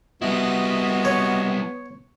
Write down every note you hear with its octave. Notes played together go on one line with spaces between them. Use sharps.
G3 B3 E4 F#4 D#5
C#5